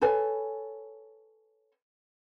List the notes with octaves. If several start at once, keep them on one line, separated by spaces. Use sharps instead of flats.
A4 B4 C#5 G#5